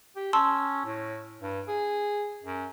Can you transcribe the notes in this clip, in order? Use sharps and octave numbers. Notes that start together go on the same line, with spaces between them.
G4
C#4 A5 C6 E6
A2
G2
G#4
F#2